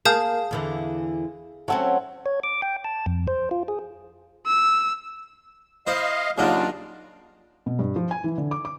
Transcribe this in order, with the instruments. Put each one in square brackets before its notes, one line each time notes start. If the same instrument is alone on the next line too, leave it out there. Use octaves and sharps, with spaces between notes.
[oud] A#3 [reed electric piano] G#4 F5 [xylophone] A5 D#6 G6
[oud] E2 D3 E3
[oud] F#3 C4 C#4 [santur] A3 F#5 E6
[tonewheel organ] C#5
D6
G5
A5
F2
C5
F4
G#4
[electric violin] E6
[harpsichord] E4 C5 [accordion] D#5 F5
[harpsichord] D#2 F#3 D#4 [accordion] C#3 [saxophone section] D4 F4
[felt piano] B2
G2
F3
G#5
E3
D3
D6
D6